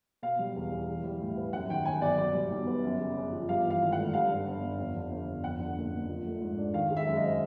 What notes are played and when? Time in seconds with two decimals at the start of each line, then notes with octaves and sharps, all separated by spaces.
0.23 B2 F5
0.39 G3
0.56 E2
0.72 E2
0.88 E3
1.04 G3
1.20 A2
1.37 B3
1.53 F#2 F#5
1.69 D#3 G5
1.85 G1 G#5
2.02 F#3 D5
2.18 B2 D5
2.34 G3
2.50 B1
2.67 B3
2.84 F#2
3.00 C#3
3.16 G1
3.32 F3
3.49 G2 F5
3.64 E3
3.70 F5
3.82 G#1
3.92 F#5
3.98 A3
4.14 G2 F5
4.31 D3
4.47 G1
4.63 G1
4.79 F2
4.95 D3
5.11 G1
5.27 G1
5.44 F2 F#5
5.60 D3
5.77 F#1
5.93 F#1
6.09 F3
6.26 A3
6.41 G#2
6.58 D4
6.74 D#3 F5
6.91 G#3
6.97 E5
7.06 F#2
7.17 D#5
7.24 C4